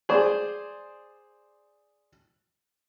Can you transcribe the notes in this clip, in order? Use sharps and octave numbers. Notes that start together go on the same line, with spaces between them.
G#4 C5 D5